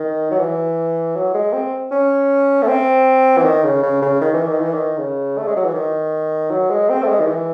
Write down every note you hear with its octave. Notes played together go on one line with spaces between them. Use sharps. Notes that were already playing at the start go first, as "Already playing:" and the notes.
Already playing: D#3
F#3
E3
F#3
G#3
C4
C#4
A3
C4
E3
D#3
C#3
C#3
C#3
D#3
E3
D#3
E3
D#3
C#3
A3
G#3
F#3
E3
D#3
F#3
G#3
C4
A3
G#3
D#3
E3